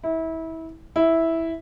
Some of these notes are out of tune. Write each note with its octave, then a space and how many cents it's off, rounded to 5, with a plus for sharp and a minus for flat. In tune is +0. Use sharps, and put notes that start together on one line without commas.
E4 -25
E4 -5